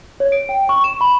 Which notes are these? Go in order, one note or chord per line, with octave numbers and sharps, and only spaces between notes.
C#5
D7
G5
C#6
E7
B5